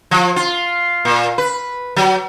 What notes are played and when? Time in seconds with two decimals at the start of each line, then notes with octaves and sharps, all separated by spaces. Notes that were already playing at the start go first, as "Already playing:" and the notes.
0.11 F3
0.36 F4
1.05 A#2
1.38 B4
1.96 F#3